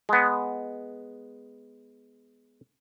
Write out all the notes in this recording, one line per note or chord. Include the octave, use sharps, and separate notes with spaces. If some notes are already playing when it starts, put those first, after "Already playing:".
G#3 B3